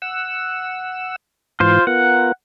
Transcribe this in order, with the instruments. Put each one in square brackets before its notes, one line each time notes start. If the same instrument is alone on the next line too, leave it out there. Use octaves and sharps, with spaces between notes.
[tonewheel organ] F#5 E6
[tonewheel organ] G#2 E3 [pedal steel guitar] F4 C5
[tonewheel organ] B3 F4 A#4 [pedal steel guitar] F#5